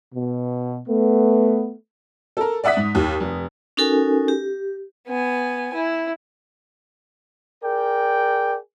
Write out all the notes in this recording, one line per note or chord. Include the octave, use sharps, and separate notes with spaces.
B2
A3 B3
A4 A#4
D5 E5 F#5 D#6 B6
G#2
D#2
F1
C#4 D#4 F#4 A4 A#4 G#5
G4
B3 G#5
E4
G#4 A#4 D5 G5